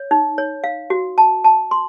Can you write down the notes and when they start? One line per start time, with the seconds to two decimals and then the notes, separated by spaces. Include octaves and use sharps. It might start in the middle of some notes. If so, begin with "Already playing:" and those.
Already playing: C#5
0.11 D#4
0.38 C#5
0.64 F5
0.90 F#4
1.18 A5
1.44 A5
1.71 C6